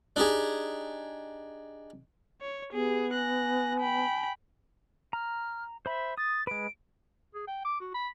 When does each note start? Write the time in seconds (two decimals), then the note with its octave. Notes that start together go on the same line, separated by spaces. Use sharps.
0.16 D4 D#4 G4 G#4
2.41 C#5
2.72 B3 G4 G#4
3.13 G#5 F#6 A#6
3.80 G5 B5
5.13 A#5 F6
5.86 C5 E5 B5
6.18 D#6 A6
6.47 G#3 B4 D7
7.35 G#4
7.47 G5
7.65 D6
7.80 F#4
7.94 B5